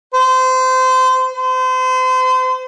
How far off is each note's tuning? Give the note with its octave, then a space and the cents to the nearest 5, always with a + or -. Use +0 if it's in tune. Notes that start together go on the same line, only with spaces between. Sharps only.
C5 -25
C5 -35